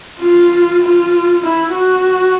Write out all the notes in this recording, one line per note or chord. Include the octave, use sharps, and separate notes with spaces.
F4
F4
E4
F#4